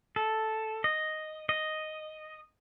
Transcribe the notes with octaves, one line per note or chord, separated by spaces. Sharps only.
A4
D#5
D#5